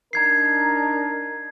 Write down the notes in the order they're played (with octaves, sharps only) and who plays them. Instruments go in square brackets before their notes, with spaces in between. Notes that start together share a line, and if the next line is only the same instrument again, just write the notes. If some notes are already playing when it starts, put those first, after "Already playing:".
[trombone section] D4 D#4 A#4 [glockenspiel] A#5 G#6 C7